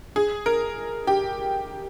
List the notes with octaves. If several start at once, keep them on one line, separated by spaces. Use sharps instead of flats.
G#4
A#4
G4